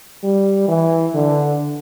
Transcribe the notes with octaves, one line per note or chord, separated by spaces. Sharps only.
G3
E3
D3